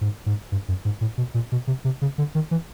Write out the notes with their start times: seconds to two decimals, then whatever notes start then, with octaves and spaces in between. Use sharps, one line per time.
0.01 G#2
0.26 G#2
0.52 G2
0.68 F#2
0.85 G#2
1.01 A2
1.18 B2
1.34 A#2
1.52 B2
1.67 C3
1.85 C3
2.02 C#3
2.18 D3
2.35 D#3
2.51 E3